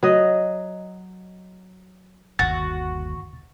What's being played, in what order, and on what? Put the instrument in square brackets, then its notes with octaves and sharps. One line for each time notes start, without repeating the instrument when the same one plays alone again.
[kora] F#3 D#5
[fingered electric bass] G1 D#2 [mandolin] F#4 [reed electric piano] A6